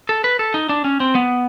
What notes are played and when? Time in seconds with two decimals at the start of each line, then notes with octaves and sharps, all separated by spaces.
0.09 A4
0.24 B4
0.39 A4
0.54 D#4
0.69 D4
0.84 C#4
1.00 C4
1.15 B3